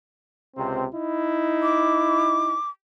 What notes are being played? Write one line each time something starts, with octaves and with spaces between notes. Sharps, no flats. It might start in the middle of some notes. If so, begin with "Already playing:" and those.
C#2 C3 C4
D#4 E4
D6